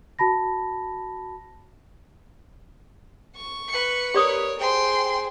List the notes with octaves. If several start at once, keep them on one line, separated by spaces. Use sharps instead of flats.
F#4 A5 B5 A#6
C#6
B4 C#7
G4 A#4 C#5 D5 D#6
G#4 C5 G5 C6